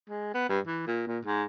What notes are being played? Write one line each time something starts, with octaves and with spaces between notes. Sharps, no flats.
G#3
B3
G2
E3
A#2
A#2
G#2